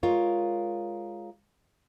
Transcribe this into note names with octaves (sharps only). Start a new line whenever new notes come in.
G#3 F4 A#4 C#5